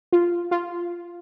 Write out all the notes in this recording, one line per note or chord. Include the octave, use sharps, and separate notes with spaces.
F4
F4